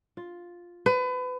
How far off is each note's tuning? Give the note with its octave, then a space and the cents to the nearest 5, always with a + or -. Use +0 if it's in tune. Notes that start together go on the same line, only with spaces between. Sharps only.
F4 +5
B4 +30